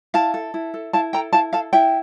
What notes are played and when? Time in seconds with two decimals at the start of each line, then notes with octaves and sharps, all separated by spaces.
0.14 E4 F5 A5
0.34 A4
0.54 E4
0.74 A4
0.93 E4 F5 A5
1.13 A4 G5 A#5
1.33 E4 F5 A5
1.53 A4 F5 A5
1.73 E4 E5 G5